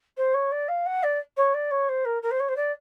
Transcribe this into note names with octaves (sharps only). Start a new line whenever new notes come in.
C5
C#5
D5
F5
F#5
D5
C#5
D5
C#5
C5
A#4
A#4
C5
C#5
C5
D5